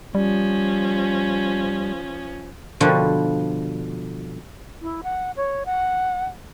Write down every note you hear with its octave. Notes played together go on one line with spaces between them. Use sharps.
F3 G3 C#4
B2 D3 F3 G3
E4
F#5
C#5
F#5